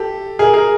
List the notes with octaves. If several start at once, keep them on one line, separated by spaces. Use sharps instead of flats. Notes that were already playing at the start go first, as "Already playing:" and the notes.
Already playing: G4 A4
G#4 A#4
G#4 A#4